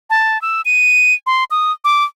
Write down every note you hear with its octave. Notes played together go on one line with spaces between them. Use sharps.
A5
E6
D#7
C6
D#6
D6